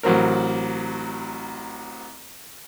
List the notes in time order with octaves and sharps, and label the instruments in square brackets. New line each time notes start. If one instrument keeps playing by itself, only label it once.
[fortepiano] A1 F#3 C4 A#4